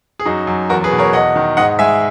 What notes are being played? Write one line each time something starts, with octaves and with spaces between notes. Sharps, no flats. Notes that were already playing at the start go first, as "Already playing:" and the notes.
G#4
F#2 D#4 F#4
F#2
E2 F#4 A#4
G#4 B4
B2
A#4 C#5
E2 D#5 F#5
D#3
G#2 D#5 F#5
G#3 E5 G#5